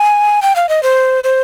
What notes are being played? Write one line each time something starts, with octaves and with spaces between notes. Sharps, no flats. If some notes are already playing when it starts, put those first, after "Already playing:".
Already playing: G#5
G5
F5
D#5
C5
C5